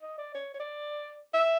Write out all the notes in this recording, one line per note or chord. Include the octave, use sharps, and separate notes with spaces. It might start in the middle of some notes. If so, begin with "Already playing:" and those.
D#5
D5
C#5
C#5
D5
E5